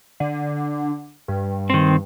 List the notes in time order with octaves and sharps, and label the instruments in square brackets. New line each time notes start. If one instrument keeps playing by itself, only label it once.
[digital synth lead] D3
G2
[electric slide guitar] D#3 C4